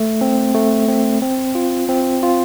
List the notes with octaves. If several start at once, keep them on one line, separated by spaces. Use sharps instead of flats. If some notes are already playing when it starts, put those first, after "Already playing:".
Already playing: A3
C4
A3
C4
C4
F4
C4
F4